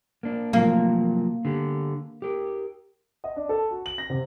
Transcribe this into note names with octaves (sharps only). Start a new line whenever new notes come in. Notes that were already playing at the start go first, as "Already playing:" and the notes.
A#3 D4
C3 F3 F#3 A#3
D3 G4
G4 A#4
D#5
D4
A4
F#4
F#7
A#6
C3